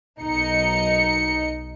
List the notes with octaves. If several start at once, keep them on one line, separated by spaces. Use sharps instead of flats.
B1 D#4 C#7